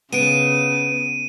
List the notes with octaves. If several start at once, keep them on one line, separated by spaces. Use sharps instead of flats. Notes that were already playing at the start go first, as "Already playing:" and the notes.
C#3 B3 D7 D#7